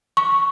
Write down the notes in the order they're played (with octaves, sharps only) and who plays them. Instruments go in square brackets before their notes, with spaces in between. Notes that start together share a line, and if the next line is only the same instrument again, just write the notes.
[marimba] C#6